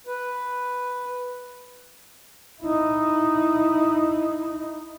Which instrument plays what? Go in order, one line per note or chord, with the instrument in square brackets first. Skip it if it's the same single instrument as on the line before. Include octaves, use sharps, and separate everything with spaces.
[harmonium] B4
[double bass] D#4 E4